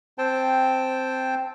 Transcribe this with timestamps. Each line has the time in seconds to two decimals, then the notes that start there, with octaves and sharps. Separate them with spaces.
0.18 C4 C5 G5 A5